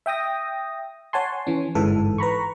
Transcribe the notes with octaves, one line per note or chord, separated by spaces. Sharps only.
E5 G5 D#6 A#6
C#5 F#5 G#5 A5 C6
E3 C#4
G1 G#2 E3 A4
B4 A#5 B5 C#6